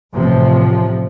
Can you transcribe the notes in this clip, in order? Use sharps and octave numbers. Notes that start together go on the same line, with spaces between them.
A1 C3 F3